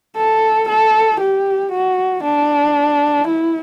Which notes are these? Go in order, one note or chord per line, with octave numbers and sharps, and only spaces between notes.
A4
A4
G4
F#4
D4
E4